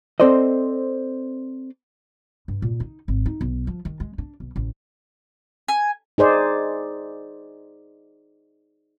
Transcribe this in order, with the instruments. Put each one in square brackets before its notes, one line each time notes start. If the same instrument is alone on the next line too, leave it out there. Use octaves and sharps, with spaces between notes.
[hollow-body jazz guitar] C4 A4 C5 D5 D#5
[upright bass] G2
A#2
D#4
G#1
D#4
B1
F3
D#3
G#3
D4
B1
A1
[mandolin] G#5
[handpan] D#4 G#4 C5 D5